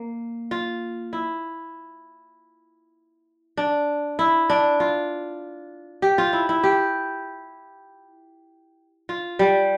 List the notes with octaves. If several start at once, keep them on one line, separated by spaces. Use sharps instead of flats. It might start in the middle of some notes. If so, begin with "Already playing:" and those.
Already playing: A#3
F4
E4
D4
E4
D4
F4
G4
F4
E4
E4
G4
F4
G3